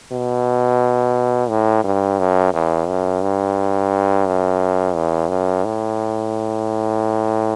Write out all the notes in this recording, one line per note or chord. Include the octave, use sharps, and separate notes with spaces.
B2
A2
G2
F#2
E2
F#2
G2
F#2
E2
F#2
A2